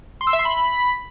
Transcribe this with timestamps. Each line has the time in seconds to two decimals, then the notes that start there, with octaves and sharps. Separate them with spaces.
0.21 C6
0.27 E6
0.33 E5
0.39 C6
0.45 B5